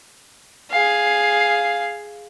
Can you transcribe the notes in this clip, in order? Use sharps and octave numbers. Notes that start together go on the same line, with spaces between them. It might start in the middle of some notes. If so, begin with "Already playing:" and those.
G#4 F5